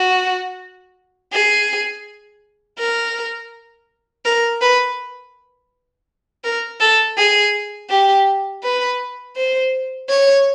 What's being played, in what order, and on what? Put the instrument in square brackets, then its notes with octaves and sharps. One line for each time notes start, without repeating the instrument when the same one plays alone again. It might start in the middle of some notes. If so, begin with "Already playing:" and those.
Already playing: [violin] F#4
G#4
A#4
A#4
B4
A#4
A4
G#4
G4
B4
C5
C#5